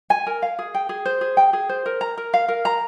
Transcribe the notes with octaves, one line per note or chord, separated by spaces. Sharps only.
G#5
A#4
F5
G#4
G5
G#4
C5
G#4
G5
G#4
C5
A#4
A#5
A#4
F5
A#4
A#5